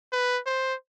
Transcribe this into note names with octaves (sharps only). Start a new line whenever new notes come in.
B4
C5